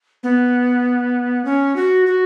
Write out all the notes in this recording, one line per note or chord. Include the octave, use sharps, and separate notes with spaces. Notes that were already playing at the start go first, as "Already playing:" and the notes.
B3
C#4
F#4
F#4